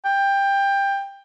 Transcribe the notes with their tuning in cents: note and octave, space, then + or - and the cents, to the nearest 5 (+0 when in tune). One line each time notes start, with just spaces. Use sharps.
G5 +15